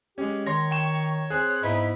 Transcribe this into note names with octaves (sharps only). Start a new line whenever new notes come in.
G#3 C#4 G4
D#3 C#5 C6 A#6
G5 C#6 E7
C4 G#4 F#6
G#2 B3 D#4 E4 B5